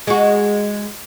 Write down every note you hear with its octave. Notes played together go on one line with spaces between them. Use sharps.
G#3 F#4